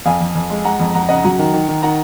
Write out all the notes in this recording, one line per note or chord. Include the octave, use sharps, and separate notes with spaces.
F2 F5 G#5
F2
F2
G#3
G#3 F#5 A#5
F2
F2 F#5 A#5
C#3 D#5 F#5
F#3 F#5 A#5
D#3
D#3
D#3
D#3 F#5 A#5